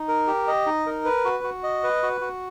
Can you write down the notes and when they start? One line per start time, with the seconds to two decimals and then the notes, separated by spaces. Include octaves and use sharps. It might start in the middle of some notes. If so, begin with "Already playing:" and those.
Already playing: D#4
0.08 A#4
0.27 G4
0.47 D#5
0.66 D#4
0.86 A#4
1.05 B4
1.25 F#4
1.44 F#4
1.63 D#5
1.83 B4
2.03 F#4
2.21 F#4